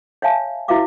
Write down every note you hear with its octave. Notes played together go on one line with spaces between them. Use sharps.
C#5 E5 F5 G#5 A5
E4 F#4 B4 E5 F5 D6